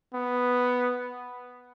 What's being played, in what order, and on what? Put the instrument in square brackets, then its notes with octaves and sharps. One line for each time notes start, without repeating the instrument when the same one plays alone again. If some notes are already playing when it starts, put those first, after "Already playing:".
[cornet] B3